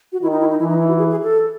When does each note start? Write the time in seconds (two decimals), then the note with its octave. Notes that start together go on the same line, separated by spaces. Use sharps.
0.12 F#4
0.21 D#3 E4
0.32 D#4
0.40 E4
0.50 D#4
0.59 E3 E4
0.69 D#4
0.79 E4
0.89 F#4
0.98 G#4
1.11 G#4
1.23 A4